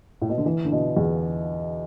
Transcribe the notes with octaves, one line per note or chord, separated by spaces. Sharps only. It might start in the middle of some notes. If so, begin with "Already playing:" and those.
A2
B2
D3
E3
D3
B2
E2